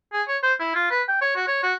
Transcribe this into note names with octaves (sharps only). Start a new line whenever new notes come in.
G#4
C#5
C5
E4
F4
B4
G5
C#5
F#4
C#5
F#4